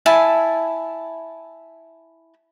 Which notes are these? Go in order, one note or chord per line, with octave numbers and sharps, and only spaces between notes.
E4 G#5 A5